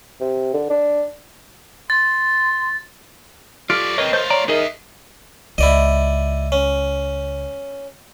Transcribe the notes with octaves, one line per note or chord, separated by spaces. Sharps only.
C3
D3
D4
C6 A6
F#3 F4 G4 A4 D5 F6 D7
D2 C4 A#4 B4 C#5 D#5
A3 F4 C5 C#5 G6
C#5 D5 A#5
B3 D#4 G#4 A#4 D#5 E5
C#2 E4 D5 D#5
C#4